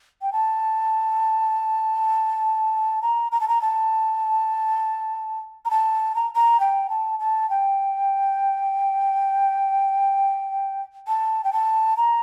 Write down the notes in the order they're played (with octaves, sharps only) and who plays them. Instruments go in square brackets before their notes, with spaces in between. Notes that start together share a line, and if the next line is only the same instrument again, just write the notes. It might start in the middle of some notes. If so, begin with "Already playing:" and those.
[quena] G5
A5
A#5
A#5
A5
A#5
A5
A#5
A5
A#5
A#5
G5
A5
A5
G5
A5
G5
A5
A#5